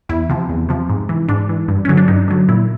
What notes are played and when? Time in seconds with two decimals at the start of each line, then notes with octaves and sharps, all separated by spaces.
0.09 E2 E4
0.30 C3 F3
0.49 E2
0.69 C3 F3
0.89 G#2
1.09 E3
1.28 G#2 D4
1.49 E3
1.68 G2
1.85 D3 F#3 C#4
1.97 D4
2.08 G2 D#4
2.28 D3 F#3
2.48 A#2 E4